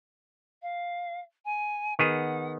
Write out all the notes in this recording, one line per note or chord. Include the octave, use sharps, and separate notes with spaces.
F5
G#5
D#3 B3 G#4 F#5